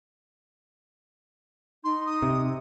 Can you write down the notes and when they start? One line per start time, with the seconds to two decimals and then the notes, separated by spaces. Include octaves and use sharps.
1.84 D#4 C6
2.06 D#6
2.22 C3